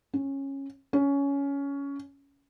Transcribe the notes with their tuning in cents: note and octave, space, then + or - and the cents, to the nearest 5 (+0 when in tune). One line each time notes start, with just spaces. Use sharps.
C#4 -15
C#4 +15